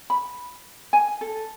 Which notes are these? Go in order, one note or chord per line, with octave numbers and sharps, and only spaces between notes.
B5
G#5
A4